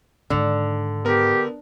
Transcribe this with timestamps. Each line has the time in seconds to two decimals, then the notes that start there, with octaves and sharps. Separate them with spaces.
0.30 G#2 D3 D#3
1.05 B3 G4 A#4